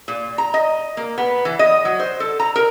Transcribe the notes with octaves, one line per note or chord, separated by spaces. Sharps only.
A#2
A#5
D#5
A#3
B3
E3
D#5
F#3
C5
A4
A#5
A#4